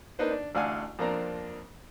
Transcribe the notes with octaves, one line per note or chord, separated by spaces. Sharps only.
A#3 D4 D#4 B4 C5
D4
A1 D2 D5 F5 F#5 G#5
F2 A#3 C4 D4 A#5